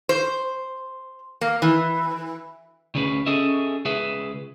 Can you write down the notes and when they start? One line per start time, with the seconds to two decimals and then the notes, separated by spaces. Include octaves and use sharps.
0.09 C5
1.41 A#3
1.62 E3
2.95 D2 C#3 C#4 G#4 B4
3.26 C#4 G#4 A4 D#5 E5
3.85 C#2 G#4 B4 E5